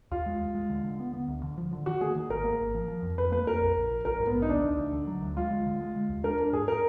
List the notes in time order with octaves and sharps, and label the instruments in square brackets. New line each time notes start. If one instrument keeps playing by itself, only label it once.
[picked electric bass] D#2 [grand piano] F4
[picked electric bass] G#3
D#2
G#3
D3
D3
B3
B3
D2
D3
F3
D3
[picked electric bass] D#3 [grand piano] F#4
[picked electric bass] A#3 [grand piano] G#4
[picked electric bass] D#3
[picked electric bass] G#1 [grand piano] A#4
[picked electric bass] A#3
G#1
F3
F3
F2
[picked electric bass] F2 [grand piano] B4
[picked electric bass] A#3 [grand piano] B4
[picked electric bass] F2 [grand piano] A#4
[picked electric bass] A#1
A#1
A#1
[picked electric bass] A#1 [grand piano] A#4
[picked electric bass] G#2
[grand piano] B3
[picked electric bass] A#1
[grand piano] D#4
[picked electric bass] D2 [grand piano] D4
[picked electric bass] D2
D2
D3
F#3
D2
[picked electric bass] G#3 [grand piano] F4
[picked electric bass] G#3
D3
G#3
G#3
D#2
[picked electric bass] D4 [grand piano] A#4
[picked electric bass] D4
[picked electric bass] G#2 [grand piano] G#4
[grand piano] A#4